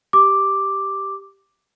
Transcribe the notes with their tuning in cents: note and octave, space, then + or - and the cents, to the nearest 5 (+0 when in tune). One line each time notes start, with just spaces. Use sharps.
G4 +0 D6 +0